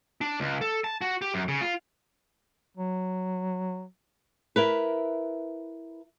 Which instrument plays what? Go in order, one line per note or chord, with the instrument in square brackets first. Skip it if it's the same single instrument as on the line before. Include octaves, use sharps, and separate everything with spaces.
[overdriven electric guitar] D4
C#2
A4
A5
F#4
G4
F#2
C#3
F4
[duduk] F#3
[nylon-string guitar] E4 A#4 B4